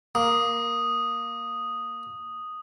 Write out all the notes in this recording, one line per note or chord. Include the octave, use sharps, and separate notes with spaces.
A#3 D#6